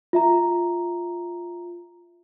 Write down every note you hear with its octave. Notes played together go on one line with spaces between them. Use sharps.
F4 E5 A#5